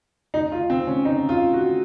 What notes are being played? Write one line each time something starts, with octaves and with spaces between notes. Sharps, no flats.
D#4
F4
C4
C#4
D#4
F4
F#4